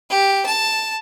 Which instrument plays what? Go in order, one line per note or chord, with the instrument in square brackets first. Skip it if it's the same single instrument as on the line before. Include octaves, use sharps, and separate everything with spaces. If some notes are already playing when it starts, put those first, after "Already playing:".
[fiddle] G4
A5